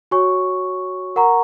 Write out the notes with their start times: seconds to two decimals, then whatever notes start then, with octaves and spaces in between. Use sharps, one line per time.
0.11 F#4 C#5 G#5 C#6
1.16 A#4 F#5 A#5 C#6